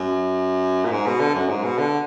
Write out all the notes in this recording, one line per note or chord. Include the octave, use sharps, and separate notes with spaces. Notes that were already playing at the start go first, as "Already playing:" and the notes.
Already playing: F#2
A#2
G#2
B2
D3
F#2
G#2
B2
D3